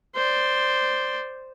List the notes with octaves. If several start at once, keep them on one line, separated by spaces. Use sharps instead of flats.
C5 D5